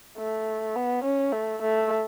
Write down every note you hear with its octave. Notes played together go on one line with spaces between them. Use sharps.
A3
B3
C#4
A3
A3